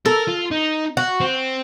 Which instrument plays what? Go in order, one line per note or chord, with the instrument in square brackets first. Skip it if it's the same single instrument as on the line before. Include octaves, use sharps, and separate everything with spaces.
[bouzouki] A4 [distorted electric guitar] A#4
[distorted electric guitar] F4
D#4
[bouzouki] F#4
[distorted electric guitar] C4